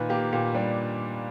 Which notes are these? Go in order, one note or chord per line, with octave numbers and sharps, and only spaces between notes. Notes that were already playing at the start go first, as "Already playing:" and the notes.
Already playing: A#2 D#3 B4
A#3 G4
A#2 G4
G3 D4